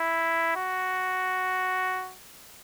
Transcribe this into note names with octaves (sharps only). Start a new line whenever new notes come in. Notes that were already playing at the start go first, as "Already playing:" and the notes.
Already playing: E4
F#4